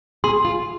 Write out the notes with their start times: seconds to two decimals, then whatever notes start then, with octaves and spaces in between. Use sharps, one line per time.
0.24 G#4 C6
0.45 F4